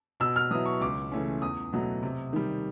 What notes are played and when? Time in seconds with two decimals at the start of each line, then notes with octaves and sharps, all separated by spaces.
0.20 B2 E6
0.36 F6
0.51 F#3 B3 E4 D#6
0.66 C#6
0.80 C#2 D6
1.12 C#3 E3 A3 C#4
1.42 E2 D#6
1.73 B2 F#3 A3
2.03 C3
2.33 D#3 G3